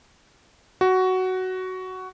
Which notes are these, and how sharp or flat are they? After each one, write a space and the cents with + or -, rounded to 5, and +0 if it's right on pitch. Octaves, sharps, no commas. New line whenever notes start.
F#4 +10